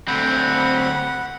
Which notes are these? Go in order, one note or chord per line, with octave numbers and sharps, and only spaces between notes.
D2 C4 F#5 B5